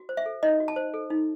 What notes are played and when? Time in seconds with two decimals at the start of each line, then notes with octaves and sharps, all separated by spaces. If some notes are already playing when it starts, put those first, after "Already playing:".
Already playing: F#4
0.09 C5
0.17 E5
0.26 A4
0.43 D#4 D#5
0.60 F#4
0.68 A5
0.76 C5
0.94 A4
1.10 D#4